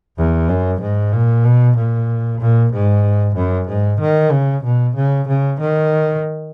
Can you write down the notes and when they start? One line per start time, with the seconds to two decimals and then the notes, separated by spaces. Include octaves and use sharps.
0.18 E2
0.49 F#2
0.81 G#2
1.12 A#2
1.44 B2
1.77 A#2
2.41 A#2
2.73 G#2
3.36 F#2
3.68 G#2
4.00 D#3
4.31 C#3
4.64 B2
4.96 C#3
5.28 C#3
5.60 D#3